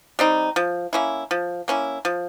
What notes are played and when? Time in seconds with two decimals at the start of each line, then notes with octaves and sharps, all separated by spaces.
0.19 G3 C4 D#4
0.56 F3
0.93 A#3 C#4 E4
1.31 F3
1.68 A#3 C#4 E4
2.05 F3